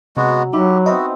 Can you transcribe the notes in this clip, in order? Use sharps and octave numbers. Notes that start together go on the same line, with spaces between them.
C3 F#3 G#3 B3 F#4
F#3 D#4 E4 F#4 G4
B3 C4 D#4 F#4 D#5 E5